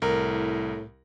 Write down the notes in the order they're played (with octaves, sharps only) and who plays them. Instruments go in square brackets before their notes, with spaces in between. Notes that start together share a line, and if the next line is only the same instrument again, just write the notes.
[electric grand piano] C2 [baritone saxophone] A2 [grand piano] A#4